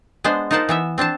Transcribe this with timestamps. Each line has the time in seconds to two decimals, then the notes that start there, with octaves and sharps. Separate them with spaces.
0.24 G#3 B3 D4 C5
0.51 D#4 F4 A#4 C5 F#5 A5
0.69 E3 B3 E5
0.98 C4 D4 C5 A5